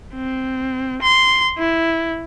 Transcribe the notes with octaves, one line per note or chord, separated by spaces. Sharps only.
C4
C6
E4